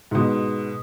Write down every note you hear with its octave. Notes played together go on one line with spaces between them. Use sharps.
G#2 B2